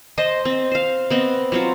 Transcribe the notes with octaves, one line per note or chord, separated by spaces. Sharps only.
C5 D#5 A5
C4
C5 F5
B3 C4 D#5
F#3 C4 F4